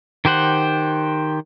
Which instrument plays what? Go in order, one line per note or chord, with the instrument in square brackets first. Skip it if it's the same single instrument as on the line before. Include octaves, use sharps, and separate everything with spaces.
[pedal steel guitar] D#3 G4 C5 F#5